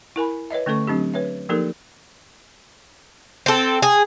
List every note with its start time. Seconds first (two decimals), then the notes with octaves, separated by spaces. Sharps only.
0.16 E4 A#4 G#5 B5
0.50 B4 C#5 D#5 E5
0.66 D3 A3 C#4 A4 C#6
0.87 F#3 C4 D4 G4
1.14 B4 C#5 E5
1.49 F3 A#3 D#4 G4 A4 A#4
3.46 C4 A4
3.82 G#4